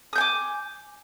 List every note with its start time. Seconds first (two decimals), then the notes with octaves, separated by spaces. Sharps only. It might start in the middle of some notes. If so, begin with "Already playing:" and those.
0.13 D#6
0.15 G6
0.18 G#5
0.21 D6